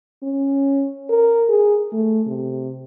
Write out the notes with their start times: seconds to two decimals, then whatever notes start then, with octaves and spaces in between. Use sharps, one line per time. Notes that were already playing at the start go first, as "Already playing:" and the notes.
0.23 C#4
1.10 A#4
1.49 G#4
1.92 A3
2.27 C3